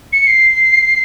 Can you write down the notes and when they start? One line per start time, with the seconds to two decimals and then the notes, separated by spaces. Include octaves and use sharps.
0.12 C#7
0.27 C7